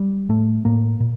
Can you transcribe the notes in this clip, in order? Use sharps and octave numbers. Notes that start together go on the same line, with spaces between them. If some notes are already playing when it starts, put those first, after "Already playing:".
Already playing: G3
A2 A3
A2 A#3
A#2